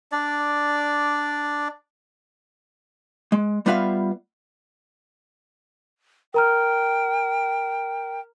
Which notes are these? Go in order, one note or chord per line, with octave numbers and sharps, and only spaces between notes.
D4 D5
G#3
G3 B3 F4 B4 E5 F5
A#4 G5 A#5 F6